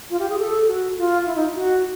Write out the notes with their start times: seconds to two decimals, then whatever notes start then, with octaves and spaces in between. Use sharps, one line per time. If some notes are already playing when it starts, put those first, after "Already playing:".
0.10 F4
0.19 G4
0.29 G#4
0.39 A4
0.68 F#4
0.98 F4
1.26 E4
1.35 D#4
1.55 F#4